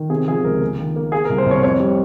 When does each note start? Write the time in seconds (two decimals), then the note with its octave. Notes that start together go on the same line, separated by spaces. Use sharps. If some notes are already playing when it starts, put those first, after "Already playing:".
Already playing: D#3
0.10 C3 G#4
0.28 F3 G#4
0.44 C#2 A#4
0.61 A#3
0.78 D#3
0.96 A#3
1.12 A#3 G#4
1.25 A#4
1.30 C2
1.38 C5
1.46 C2 C#5
1.63 F2 C#5
1.80 G3